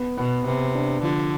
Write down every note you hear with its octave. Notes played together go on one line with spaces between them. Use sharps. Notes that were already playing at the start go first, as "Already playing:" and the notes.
Already playing: B3
B2 B3
C3 B3
D4
D3 F3